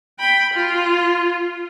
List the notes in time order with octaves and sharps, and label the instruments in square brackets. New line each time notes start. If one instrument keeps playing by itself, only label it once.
[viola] G5 B5
F4